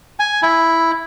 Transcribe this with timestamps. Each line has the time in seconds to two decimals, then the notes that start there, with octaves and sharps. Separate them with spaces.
0.19 G#5
0.43 E4